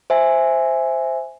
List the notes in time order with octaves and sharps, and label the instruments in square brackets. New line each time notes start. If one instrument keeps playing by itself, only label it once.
[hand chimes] C5 E5 G#5